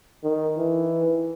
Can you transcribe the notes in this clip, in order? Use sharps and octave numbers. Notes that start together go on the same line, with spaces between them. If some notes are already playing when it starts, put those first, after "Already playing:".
D#3
E3